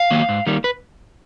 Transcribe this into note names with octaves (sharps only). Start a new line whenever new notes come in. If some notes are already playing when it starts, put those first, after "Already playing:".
Already playing: F5
D#3 F#3 A#3
G#2
D#3 G3 A#3
B4